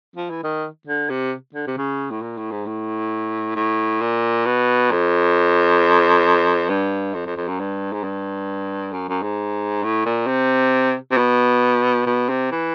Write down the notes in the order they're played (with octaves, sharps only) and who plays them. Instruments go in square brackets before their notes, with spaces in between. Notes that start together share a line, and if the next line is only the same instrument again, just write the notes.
[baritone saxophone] F3
E3
D#3
D3
C3
D3
C3
C#3
A2
A#2
A2
G#2
A2
A2
A#2
B2
F2
G2
F2
F2
F2
F#2
G2
G#2
G2
F#2
F#2
G#2
A2
A#2
C3
C3
B2
B2
C3
E3